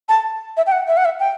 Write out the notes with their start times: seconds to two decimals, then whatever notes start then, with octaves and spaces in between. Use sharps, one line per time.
0.09 A5
0.57 E5
0.66 G5
0.72 F#5
0.88 E5
0.97 F#5
1.05 E5
1.20 G5